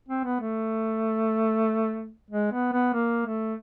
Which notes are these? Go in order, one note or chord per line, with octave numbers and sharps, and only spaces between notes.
C4
B3
A3
G#3
B3
B3
A#3
A3